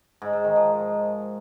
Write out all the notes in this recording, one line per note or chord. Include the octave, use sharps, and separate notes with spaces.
G#2
G#2
D#3
F3